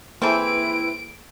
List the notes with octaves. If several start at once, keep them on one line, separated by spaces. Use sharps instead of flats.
E3 A#3 C4 E4 G#4 A4 B4 D7